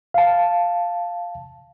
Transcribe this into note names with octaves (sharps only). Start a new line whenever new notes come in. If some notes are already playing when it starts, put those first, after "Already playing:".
F5 A5